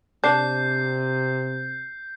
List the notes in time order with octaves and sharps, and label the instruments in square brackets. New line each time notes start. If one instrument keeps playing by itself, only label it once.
[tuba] C3 [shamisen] D4 [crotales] G6 C7